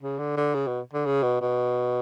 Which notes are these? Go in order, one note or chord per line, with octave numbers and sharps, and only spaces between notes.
C#3
D3
D3
C#3
B2
D3
C#3
B2
B2